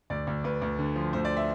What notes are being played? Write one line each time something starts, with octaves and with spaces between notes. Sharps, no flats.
D2 D5
D2
D2 B4
D2
D3
F3
D2 C5
D5
E5